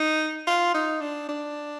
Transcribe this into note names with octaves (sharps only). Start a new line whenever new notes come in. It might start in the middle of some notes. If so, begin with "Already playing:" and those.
Already playing: D#4
F4
D#4
D4
D4